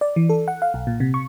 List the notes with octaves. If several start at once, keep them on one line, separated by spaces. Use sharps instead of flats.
D5
E3
A4
F#5
F5
B1
A#2
C3
C#6